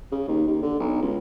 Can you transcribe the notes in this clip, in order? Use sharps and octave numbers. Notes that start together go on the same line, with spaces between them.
C#3
D#2
D#2
D3
B1
C#2